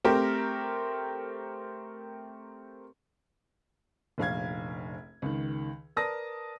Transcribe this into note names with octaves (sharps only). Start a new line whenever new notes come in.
A3 C4 G4 A#4
F1 A#1 F5 G#6
C#2 D#3
A#4 B4 D5 A5 D#6 A#6